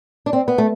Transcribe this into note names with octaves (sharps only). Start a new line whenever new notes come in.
D4
C4
B3
A3